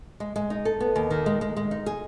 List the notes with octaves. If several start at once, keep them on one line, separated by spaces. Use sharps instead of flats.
G#3
G#3
D#4
A4
B3
D#2
D#3
G#3
G#3
G#3
D#4
G#4